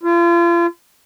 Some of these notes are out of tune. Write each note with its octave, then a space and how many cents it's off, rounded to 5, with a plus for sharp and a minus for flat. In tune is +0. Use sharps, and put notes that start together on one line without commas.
F4 -35